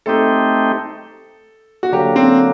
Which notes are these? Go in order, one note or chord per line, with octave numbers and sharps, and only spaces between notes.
A3 C4 D#4 G4 A4
F#4
D3 F#3 A#3 G4
C4